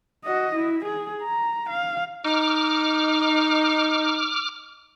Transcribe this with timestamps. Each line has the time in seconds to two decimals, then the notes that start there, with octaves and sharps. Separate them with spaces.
0.24 F#4 D#5
0.55 E4
0.85 G#4
1.22 A#5
1.70 F5
2.25 D#4 D6 F6